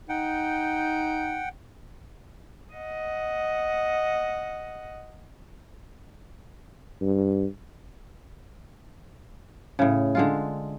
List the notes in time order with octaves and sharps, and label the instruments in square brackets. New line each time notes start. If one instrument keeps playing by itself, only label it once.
[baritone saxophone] D#4 [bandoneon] F#5 G5
[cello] D#5 F#5
[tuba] G2
[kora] A2 C#3
D3 G#3 F4